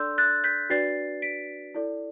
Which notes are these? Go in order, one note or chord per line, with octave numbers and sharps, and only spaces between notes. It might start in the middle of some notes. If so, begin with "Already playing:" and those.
Already playing: D4 A4 D5 C6 E6 G6
F#6 A6
G6 B6
D4 F#4 B4 D5 A6 C7
B6 D7
E4 A4 D5